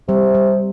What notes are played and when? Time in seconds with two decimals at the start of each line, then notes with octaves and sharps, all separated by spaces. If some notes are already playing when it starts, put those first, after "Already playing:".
0.08 C3 G3
0.35 G3